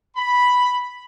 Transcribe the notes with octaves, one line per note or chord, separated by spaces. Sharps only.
B5